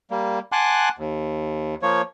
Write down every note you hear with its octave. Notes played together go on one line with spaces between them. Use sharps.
G3 A#3
F#5 G#5 A5 C6 D6 F#6
D#2
F3 A#3 C#5